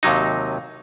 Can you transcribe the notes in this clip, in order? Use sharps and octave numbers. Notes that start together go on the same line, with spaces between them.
D#2 C3 F#3 D#4